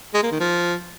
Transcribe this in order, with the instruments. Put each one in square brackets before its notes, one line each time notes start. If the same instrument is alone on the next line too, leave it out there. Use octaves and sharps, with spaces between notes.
[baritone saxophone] G#3
A#3
D#3
F3